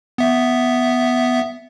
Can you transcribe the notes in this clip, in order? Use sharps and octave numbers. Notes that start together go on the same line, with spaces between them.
B3 E5